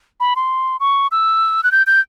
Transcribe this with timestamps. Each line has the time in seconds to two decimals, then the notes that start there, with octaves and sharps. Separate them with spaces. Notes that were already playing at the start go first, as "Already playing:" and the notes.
0.20 B5
0.36 C6
0.80 C#6
1.12 E6
1.63 F#6
1.72 G6
1.87 G6